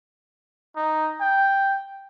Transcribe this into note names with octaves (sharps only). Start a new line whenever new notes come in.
D#4
G5